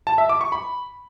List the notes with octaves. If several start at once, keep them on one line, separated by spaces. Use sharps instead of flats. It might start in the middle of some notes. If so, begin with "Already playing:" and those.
A5
E5
D6
C#6
B5